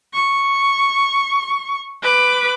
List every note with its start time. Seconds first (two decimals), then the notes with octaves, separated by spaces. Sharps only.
0.13 C#6
2.02 B4 D6